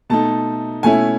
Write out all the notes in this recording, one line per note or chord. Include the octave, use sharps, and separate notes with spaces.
B2 A3 D#4 A5
B2 A3 C#4 E4 G#5